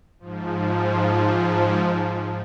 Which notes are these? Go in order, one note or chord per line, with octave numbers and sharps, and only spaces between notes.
G#2 F3